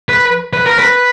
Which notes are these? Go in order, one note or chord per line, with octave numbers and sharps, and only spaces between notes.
B4
B4
A#4
B4